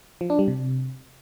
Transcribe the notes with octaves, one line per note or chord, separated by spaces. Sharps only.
F3
D4
G3
C3